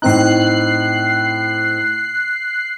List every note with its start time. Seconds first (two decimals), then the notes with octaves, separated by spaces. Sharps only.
0.02 A2 C4 D#4 F#6 C7